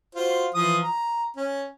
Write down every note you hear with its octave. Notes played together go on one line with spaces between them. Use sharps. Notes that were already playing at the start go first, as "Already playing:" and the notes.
F4 F#4 C5
E3 F3 D#6
A#5
C#4